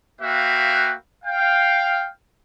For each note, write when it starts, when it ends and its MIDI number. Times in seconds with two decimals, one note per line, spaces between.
0.21 0.93 58
0.21 0.93 66
0.21 0.93 71
0.21 0.93 76
0.21 0.93 77
0.21 0.93 79
1.25 2.08 77
1.25 2.08 79